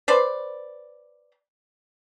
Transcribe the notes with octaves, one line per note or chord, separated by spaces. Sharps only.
B4 C5 D5